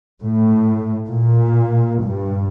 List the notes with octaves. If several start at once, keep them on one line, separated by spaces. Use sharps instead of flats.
A2
A#2
G2